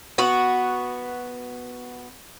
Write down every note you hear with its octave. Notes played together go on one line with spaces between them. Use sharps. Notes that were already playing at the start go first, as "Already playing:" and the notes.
B3 F#4